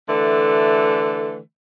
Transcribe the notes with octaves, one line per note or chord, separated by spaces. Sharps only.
D3 E3 A3